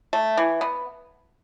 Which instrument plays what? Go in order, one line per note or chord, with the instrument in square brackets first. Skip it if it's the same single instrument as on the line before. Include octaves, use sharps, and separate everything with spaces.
[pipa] A3
E3
B3